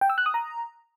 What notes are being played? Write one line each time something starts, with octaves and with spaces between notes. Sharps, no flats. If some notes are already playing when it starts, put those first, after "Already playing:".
G5
E6
F#6
D#6
A#5